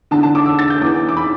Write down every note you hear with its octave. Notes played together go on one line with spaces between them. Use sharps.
E2 D3 A5
A5
D6
E6
A6
G6
E2 E3 D6
D6
B5